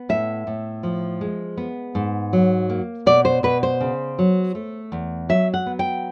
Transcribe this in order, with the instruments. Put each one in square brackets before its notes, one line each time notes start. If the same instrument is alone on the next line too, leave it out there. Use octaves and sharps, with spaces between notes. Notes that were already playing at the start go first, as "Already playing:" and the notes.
Already playing: [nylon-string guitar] B3
A2 E5
A2
F3
G#3
B3
G#2
F#3
A#3
B2 D5
C5
B2 B4
C5
C#3
F#3
A3
E2
F#3 E5
F#5
B3
G5